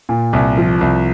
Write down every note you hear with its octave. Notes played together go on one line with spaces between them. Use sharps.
A#2
C2
F3
C2